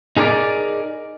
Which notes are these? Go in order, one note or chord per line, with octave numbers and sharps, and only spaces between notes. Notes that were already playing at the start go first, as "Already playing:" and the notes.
D#4 G#4 A#4 C#5 D5